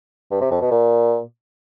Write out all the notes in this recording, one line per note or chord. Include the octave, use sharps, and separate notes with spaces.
G2
C3
F2
B2
A#2